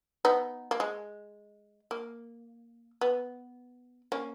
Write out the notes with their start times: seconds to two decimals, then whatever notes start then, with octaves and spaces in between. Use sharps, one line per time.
0.25 B3 D#4
0.71 A#3
0.80 G#3
1.91 A#3
3.01 B3
4.12 A#3 C#4